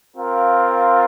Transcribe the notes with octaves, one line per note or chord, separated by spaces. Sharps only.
C4 F4 A#4 F5